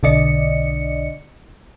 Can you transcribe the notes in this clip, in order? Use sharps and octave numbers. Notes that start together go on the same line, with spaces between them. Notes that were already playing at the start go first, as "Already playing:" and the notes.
B1 D3 D4 D5 D#5 C#7